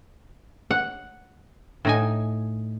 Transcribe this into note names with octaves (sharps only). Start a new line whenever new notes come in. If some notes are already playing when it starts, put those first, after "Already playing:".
F#5
A2 D#4 G#5